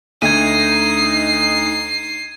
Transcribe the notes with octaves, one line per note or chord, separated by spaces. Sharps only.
D2 D#4 G#6 C7 D#7